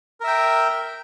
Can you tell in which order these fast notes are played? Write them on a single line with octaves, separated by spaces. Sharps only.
A#4 E5 G5